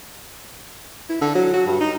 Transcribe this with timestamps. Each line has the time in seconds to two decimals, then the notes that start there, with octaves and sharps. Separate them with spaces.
1.09 E4
1.21 D3
1.35 F#3
1.53 F#4
1.66 G2
1.80 D#4